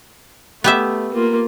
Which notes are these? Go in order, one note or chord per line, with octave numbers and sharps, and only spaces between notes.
A3 B3 G4 E5
A#3 F4